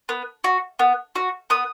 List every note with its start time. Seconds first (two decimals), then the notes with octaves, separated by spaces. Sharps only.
0.09 B3
0.44 F#4
0.79 B3
1.16 F#4
1.50 B3 D#6